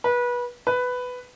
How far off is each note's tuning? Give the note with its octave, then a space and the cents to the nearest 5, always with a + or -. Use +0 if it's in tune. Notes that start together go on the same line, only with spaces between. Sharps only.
B4 -25
B4 +10